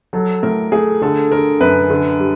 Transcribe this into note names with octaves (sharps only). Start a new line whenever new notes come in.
F#3 A4
A2 A#4
A3 G#4
D3 A4
D3 A#4
F#2 B4
D3
G3